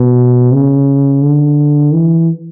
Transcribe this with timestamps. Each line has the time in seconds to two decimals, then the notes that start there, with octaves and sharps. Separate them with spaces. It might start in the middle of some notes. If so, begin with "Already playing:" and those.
Already playing: B2
0.52 C#3
1.23 D3
1.93 E3